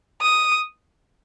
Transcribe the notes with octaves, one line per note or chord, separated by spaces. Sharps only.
D#6